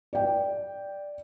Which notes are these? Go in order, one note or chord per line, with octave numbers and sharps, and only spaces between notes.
D5 G5